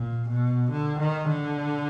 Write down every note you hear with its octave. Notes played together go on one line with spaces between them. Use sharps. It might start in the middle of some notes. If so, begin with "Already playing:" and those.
Already playing: A#2
B2
D3
D#3
D3